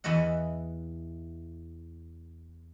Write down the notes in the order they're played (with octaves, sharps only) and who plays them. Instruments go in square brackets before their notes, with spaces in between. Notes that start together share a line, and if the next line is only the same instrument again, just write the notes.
[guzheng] E2 E3 B4 D#5 F#5